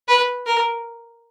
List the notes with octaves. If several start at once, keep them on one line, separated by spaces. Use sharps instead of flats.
B4
A#4